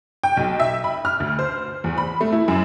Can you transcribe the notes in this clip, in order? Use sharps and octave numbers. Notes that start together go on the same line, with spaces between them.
G5
B1
E5
B5
F6
D2
C5
E2
B5
A3
E4
F#2